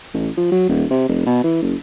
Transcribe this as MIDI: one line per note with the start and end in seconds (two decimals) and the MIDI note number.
0.14 0.29 33
0.37 0.47 53
0.51 0.67 54
0.69 0.85 27
0.91 1.07 48
1.09 1.27 29
1.27 1.40 47
1.44 1.61 52
1.62 1.75 30